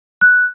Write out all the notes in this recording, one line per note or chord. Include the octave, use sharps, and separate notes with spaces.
F#6